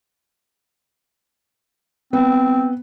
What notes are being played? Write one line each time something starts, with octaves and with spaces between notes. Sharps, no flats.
B3 C4